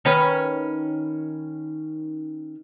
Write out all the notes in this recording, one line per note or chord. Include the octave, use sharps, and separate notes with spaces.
D#3 C#4 B4